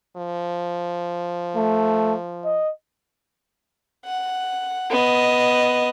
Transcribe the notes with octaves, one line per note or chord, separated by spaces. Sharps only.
F3
A3
D#5
F#5
B3 D#5